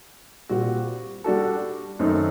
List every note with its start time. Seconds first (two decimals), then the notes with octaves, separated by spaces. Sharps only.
0.49 A#2 G3 C4 F#4
1.24 G3 D4 F#4 A4
1.99 F#2 D#3 A3 C4 D#4